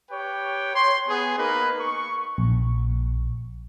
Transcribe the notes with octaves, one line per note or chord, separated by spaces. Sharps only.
G4 B4 C#5 G5
C#5 C6
B3 G#4
A#3 D#4 A#4 B4
C#6
A#1